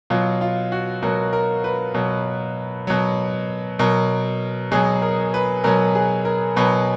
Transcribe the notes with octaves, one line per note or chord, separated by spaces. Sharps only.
B2 F#3 F4
F4
F#4
B2 F#3 A#4
A#4
B4
B2 F#3
B2 F#3
B2 F#3 A#4
B2 F#3 G#4
A#4
B4
B2 F#3 A#4
G#4
A#4
B2 F#3 B4